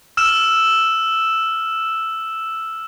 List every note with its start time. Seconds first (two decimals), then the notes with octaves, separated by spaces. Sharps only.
0.17 E6 F6 E7